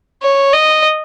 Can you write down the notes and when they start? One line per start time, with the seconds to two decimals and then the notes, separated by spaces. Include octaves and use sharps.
0.23 C#5
0.53 D#5